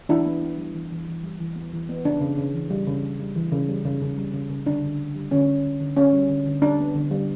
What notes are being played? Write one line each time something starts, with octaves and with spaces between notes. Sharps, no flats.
E3 D4 E4
B3
B3
G3
E3
E3
E3
G3
E3
B3
E3
B3
C#3 D4
C#3
C#3
E3
G3
C#3
C#3
G3
E3
C#3
G3
C#3
C#3
G3
C#3
C#3
D3 D4
D3
D3
G3
D3 C#4
D3
D3
D3
D3 C#4
G3
D3
D3
G3 D4
B3
D3
G3